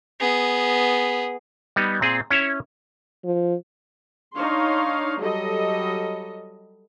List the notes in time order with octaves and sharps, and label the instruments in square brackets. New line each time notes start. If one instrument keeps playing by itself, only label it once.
[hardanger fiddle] B3 G#4
[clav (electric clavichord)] G3 B3 D#4
A#2 C4 G#4
C#4 E4 C#5 E5
[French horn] F3
[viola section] D4 D#4 C#5 F5 C6
F#3 G3 A4 D#5